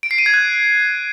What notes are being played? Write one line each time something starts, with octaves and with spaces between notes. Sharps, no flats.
D7
C7
D#7
G#6
F#6